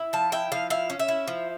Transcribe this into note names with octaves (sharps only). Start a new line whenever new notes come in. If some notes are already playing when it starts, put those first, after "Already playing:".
Already playing: E4
F3 A5
E4 G5
F3 F5
E4 F5
C#4
E5
E4
F3